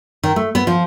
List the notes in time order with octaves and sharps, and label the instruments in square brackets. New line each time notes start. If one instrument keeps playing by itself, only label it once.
[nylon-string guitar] D#3
A3
B3
F3